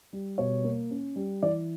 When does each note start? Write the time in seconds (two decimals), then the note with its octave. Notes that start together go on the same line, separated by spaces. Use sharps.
0.13 G3
0.38 B2 C#5
0.64 A#3
0.91 C#4
1.16 G3
1.43 E3 D5